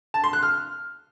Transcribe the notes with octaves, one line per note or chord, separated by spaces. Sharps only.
A5
C6
F#6
F6